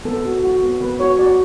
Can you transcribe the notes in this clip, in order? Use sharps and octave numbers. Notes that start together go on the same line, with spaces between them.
B3 A4
F#4
F#4
B3
B3 B4
F#4 C#5
F#4 D5